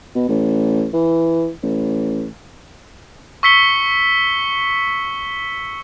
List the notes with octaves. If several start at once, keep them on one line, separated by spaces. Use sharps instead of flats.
B2
A1
E3
A1
C#6 E6 B6 C#7 G7